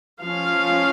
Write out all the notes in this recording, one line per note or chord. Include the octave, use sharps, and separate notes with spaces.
F3 C#4 F5